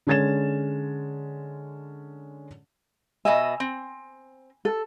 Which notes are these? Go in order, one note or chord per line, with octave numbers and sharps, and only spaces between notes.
D3 G#3 C#4 G#6 A6 E7
B2 D#5 E5 G#5
C4
A4